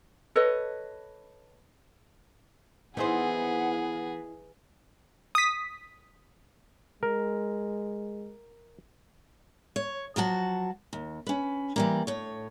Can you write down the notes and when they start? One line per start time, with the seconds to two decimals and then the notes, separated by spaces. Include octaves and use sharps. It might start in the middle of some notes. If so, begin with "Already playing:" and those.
0.36 A4 B4 C#5 D#5
2.97 E3 B3 D#4 E4 G#4 C5 F#5
5.35 D#6 B6
7.03 G#3 A#4
9.76 C#5
10.16 F3 F#3 F#4 A5
10.93 D#2
11.27 C#4 B4
11.76 E3 G3 A#3
12.07 A2 C#5